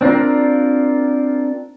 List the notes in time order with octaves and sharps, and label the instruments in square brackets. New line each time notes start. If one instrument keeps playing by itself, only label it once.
[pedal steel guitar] C4 D4 F4 A#4